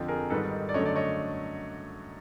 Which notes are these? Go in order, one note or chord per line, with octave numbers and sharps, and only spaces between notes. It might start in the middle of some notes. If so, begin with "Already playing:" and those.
Already playing: F2 D3 F3
G#4 A#4
G#2 D#3 G3 A4 B4
D5
F#2 D3 F#3 A3 C#5 D#5
D5
C#5 D#5